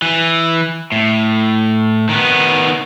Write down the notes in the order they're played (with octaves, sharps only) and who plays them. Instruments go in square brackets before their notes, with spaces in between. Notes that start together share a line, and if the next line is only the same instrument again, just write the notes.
[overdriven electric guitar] E3
A2
D#3 B3